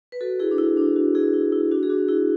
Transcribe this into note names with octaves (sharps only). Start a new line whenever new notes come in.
B4
F#4 A4
E4 G#4
D4
E4
D4
D4 F#4
E4 G#4
E4
E4
D4 F#4
G#4
D4 F#4
E4 G#4